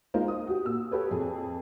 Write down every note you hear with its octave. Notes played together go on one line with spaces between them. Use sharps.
G#3 D#4 F4 A#4 C5
D#6
F#4 G4
A#2 E6
G4 A4 B4 C#5
F2 G#4